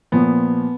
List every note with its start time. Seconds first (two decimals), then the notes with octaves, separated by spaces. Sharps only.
0.12 A#2 F3 B3